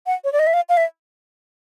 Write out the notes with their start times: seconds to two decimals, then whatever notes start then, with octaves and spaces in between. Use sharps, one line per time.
0.07 F#5
0.24 C#5
0.33 D5
0.39 D#5
0.47 E5
0.54 F5
0.69 F5
0.77 E5